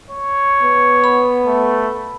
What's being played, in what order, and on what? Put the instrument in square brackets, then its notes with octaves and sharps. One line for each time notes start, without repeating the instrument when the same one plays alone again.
[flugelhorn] C#5
[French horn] B3
[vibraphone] B5
[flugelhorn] A3